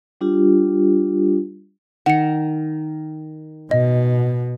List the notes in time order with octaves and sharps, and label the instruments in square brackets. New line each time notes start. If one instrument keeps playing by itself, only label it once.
[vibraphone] G3 D4 F4 G4
[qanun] D#3 [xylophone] F#5 C#7
[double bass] B2 [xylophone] D#5